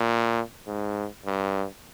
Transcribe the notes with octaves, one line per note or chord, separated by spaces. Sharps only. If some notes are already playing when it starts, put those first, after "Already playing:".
Already playing: A#2
G#2
G2